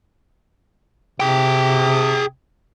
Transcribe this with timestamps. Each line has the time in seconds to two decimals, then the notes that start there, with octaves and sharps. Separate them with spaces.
1.20 C3 G#4 G5